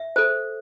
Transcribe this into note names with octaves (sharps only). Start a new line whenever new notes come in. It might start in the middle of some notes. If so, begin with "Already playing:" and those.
Already playing: E5
A4 C5